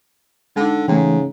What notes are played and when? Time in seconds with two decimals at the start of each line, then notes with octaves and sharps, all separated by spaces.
0.56 D3 G#3 D#4
0.88 G#2 C#3 E3 A3 G5